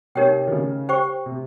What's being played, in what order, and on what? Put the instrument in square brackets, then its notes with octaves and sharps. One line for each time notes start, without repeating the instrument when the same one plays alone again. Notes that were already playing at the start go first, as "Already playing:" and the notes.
[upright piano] C3 [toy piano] D#4 G4 A#4 C#5 G5
[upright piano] D#3
C#3
[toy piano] G4 C5 G5 C#6
[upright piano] C3